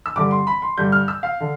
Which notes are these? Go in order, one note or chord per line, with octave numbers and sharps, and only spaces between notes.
E6
G2 D3 G3 D6
C6
B5
C6
G2 D3 G3 G6
F6
E6
F5
D3